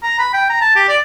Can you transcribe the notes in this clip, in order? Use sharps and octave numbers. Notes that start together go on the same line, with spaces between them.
A#5
B5
G5
A#5
A5
G4
D5